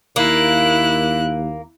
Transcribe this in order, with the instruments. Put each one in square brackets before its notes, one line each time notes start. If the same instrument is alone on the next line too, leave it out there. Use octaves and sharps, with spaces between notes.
[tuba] D#2 [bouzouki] A#3 [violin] E4 F#6